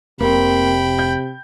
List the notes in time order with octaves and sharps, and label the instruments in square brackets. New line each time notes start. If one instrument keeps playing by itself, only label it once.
[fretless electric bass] F1 [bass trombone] C3 [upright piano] A#3 C4 [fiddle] G5 B5
[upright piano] G6